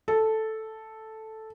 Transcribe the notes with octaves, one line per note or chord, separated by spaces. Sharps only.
A4